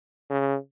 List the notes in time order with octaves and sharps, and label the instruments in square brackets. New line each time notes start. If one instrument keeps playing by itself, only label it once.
[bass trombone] C#3